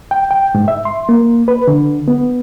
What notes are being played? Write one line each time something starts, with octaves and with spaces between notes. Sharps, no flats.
G5
G5
G#2
E5
C6
A#3
B4
D3
B3